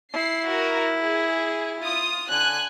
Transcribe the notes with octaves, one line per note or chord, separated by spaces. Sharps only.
E4 C7
F#4 A#4
G#4
F4 D#6
D3 G#5 F#6